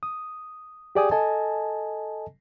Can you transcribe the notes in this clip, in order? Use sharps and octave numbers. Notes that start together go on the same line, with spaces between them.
D#6
G4 G#4 D5 G5 G#5 D#6
A4 D#5 G#5 A5